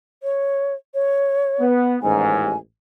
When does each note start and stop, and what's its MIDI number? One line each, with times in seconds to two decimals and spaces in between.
0.23 0.74 73
0.94 1.64 73
1.60 1.97 59
2.02 2.54 33
2.02 2.54 39
2.02 2.54 44
2.02 2.57 80